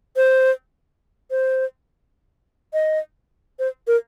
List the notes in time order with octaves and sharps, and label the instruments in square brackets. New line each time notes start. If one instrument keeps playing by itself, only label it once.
[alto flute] C5
C5
D#5
C5
A#4